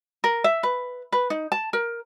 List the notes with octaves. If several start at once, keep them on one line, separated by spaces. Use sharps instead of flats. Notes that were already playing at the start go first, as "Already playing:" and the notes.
A#4
E5
B4
B4
D#4
A5
A#4